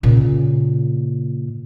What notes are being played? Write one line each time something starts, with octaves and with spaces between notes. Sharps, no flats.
A#2 C#3